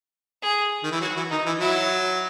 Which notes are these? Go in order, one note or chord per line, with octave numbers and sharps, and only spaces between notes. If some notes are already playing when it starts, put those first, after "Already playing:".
G#4
D#3
E3
F#3 F#4
E3
D#3 D#4
E3
F#3 E4